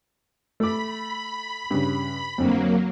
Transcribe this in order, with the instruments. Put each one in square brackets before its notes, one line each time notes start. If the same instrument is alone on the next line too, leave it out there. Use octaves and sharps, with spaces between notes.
[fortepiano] A3 D6 [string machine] B5
[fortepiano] G2 C#3
[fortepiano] F2 D3 C4 [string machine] F#3 A#3